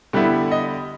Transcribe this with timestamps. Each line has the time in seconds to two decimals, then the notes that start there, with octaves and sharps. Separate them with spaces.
0.13 D3 G3 B3 E4
0.51 D#5